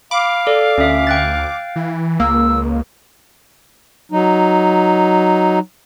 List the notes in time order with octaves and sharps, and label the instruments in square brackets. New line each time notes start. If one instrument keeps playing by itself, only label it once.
[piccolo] F5 [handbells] B5 [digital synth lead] D6
[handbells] A4 D5
[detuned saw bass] D2 [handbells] C#4 E5
[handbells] G5 F#6 A6
[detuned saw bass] E3
[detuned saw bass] C#2 [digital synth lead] A#3 [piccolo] E6
[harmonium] F#3 D#4